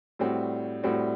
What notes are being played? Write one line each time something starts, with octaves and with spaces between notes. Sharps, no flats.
A2 G3 C4 F#4
A2 G3 C4 F#4